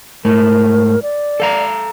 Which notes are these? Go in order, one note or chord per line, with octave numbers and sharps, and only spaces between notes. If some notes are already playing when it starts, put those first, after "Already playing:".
G#2 A3 A#4
D5
A4 F5 A#5